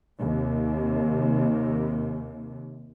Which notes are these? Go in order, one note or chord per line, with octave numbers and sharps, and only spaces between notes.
D#2 C3